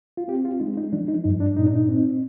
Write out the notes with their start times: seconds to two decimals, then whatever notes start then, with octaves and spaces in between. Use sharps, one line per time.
0.17 F4
0.28 C4 G4
0.45 F4
0.60 G#3 D#4
0.77 D#4
0.93 F3 D4
1.08 D#4
1.24 G2 D#4
1.40 D4
1.57 A#2 D#4
1.66 D4
1.75 D#4
1.88 C4